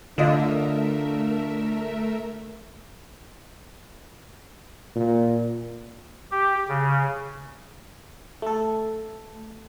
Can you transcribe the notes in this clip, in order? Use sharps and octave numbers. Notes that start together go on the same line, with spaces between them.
D3 A3 D4 F4 A#4 D#5 E5
A#2
G4
C#3
A3 A4